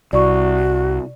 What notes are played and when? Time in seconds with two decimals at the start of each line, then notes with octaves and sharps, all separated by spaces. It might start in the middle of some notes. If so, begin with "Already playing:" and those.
0.13 C2 F#4 D5 C#6